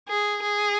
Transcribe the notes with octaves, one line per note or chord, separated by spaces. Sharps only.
G#4
G#4